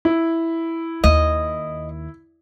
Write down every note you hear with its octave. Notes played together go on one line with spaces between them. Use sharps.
E4
D#2 D#5